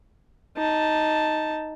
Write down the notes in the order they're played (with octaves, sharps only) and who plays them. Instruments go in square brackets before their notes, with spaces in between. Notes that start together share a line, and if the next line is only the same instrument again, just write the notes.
[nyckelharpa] D#4 A5